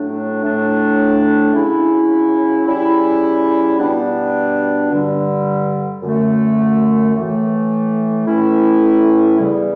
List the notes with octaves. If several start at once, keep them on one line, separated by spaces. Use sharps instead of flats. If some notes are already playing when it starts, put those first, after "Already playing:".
Already playing: A2 F#3 A3 D4
A2 F#3 A3 D4
C#3 F#3 C#4 E4
C#3 G3 C#4 E4
B2 G3 B3 D4
G2 D3 G3
F#2 D3 A3
A2 E3 A3
A2 E3 A3 C#4 E4
E2 C#3 G3